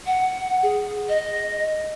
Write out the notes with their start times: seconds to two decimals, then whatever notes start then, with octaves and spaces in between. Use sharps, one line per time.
0.06 F#5
0.63 G#4
1.09 D#5